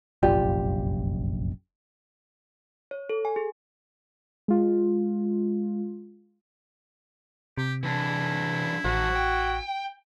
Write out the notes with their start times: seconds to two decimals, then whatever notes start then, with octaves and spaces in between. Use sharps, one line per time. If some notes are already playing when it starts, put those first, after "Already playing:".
0.23 F1 A#1 F#2 F4 G4 D5
2.91 C#5
3.09 A4
3.25 G#5
3.36 G#4
4.48 G#3 F4
7.58 C3 G4
7.83 E3 D4 E4
8.85 A1 D#3 F#4 C5
9.16 G5